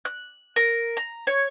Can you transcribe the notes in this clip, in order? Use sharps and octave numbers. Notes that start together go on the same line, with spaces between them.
F#6
A#4
A#5
C#5